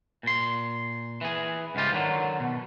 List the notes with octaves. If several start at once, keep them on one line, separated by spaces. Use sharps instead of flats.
A#2 C6
E3 G#4
C#2 G#2 G#3 F4 G4
D3 D#3 F#3
B2